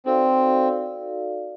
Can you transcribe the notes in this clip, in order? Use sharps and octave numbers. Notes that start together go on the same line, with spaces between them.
C4 D#4 F#4 A4 D5 F5